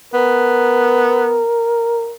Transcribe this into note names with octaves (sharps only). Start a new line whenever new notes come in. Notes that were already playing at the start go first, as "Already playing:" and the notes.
B3 A#4